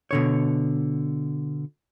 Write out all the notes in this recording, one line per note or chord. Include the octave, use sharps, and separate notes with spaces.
B2 D3 C#5